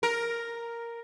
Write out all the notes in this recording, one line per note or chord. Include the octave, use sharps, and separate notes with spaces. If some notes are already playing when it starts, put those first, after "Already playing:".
A#4